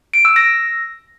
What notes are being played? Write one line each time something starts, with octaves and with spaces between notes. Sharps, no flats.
D7
E6
A#6